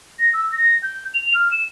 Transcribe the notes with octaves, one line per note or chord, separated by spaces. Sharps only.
A#6
E6
A#6
G6
F7
F6
E7